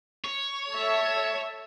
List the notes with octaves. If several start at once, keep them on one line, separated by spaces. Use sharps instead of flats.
C#5
A4 E5 A5